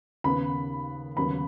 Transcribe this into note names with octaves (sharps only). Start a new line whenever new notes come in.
D#2 C#3 B3 B5
D#2 C#3 F#3 B3 B5